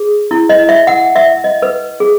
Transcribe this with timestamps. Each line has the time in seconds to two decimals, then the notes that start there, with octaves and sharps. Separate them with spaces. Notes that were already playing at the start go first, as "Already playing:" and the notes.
Already playing: G#4
0.31 E4
0.49 D#5
0.69 E5
0.87 F#5
1.16 E5
1.44 D#5
1.62 B4
2.00 G#4